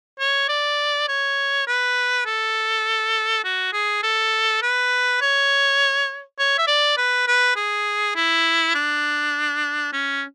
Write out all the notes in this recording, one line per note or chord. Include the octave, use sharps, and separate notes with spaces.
C#5
D5
C#5
B4
A4
F#4
G#4
A4
B4
C#5
C#5
E5
D5
B4
B4
G#4
E4
D4
C#4